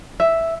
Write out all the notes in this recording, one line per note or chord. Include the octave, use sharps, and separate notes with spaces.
E5